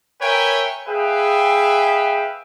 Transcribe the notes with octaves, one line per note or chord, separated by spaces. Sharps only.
A#4 B4 C#5 E5 G5 G#5
G#4 B4 E5 F5 G5